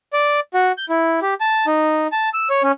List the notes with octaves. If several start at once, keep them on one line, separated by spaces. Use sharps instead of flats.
D5
F#4
G6
E4
G4
A5
D#4
A5
E6
C#5
C#4